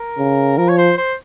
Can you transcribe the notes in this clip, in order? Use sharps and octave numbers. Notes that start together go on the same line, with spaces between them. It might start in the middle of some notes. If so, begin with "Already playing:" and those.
Already playing: A#4
C#3
F3 A#4
C#5
C5
C5